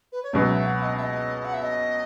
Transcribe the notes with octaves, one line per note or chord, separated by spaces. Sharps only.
B4
C#5
C#2 B2 F#3 D#5
E5
F#5
D#5
E5
D#5
F#5
E5
D#5